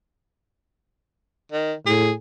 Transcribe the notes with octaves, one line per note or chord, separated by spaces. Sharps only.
D#3
A2 G#4